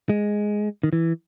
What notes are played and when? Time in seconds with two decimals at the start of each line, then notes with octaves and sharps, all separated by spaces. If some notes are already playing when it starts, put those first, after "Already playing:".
0.09 G#3
0.83 D#3
0.93 E3